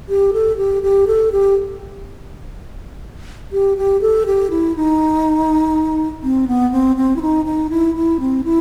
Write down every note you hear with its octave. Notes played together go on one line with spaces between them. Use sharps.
G4
A4
G4
G4
A4
G4
G4
G4
A4
G4
E4
D#4
C4
B3
C4
C4
E4
D#4
D#4
E4
E4
C4
E4